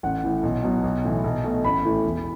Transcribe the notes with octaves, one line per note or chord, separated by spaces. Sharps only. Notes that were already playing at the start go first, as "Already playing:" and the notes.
A1 F#5
A2 E3
B1
B2 F#3
B1
A2 E3
B1
B2 A3
A1 B5
A2 E3 A3
E1